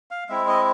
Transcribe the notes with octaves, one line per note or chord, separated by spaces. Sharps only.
F5
G#3 C4 E4 E5
D#5